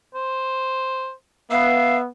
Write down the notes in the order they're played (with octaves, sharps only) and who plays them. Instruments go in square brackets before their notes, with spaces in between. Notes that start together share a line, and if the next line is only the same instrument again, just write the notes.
[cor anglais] C5
[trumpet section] B3 [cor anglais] E5 [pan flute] F5